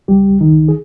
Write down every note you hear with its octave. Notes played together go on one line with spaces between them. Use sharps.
C#2 G3 G4
C#2
D#3 D#4
C#2
G#4